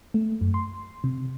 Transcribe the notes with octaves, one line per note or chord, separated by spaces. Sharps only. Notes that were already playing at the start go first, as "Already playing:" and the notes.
A3
F#2
C6
C3